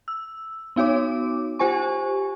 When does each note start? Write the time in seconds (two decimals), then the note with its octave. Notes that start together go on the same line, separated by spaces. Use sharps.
0.08 E6
0.76 B3 D#4 F#4 C#5 D6
1.59 F4 G4 C5 G#5 C#6